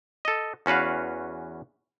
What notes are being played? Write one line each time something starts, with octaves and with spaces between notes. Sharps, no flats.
A4 D#5
E2 C#4 F#4 B4 F5